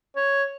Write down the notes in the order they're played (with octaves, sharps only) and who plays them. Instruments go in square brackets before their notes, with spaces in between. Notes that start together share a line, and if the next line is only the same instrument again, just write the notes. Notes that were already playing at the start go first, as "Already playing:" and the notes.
[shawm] C#5